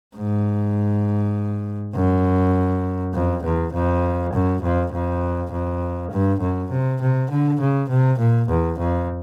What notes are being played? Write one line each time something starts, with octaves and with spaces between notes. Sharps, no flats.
G#2
F#2
F2
E2
F2
F#2
F2
F2
F2
G2
F#2
C3
C3
D3
C#3
C3
A#2
E2
F2